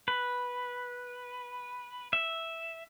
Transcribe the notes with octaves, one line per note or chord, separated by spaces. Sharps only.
B4
E5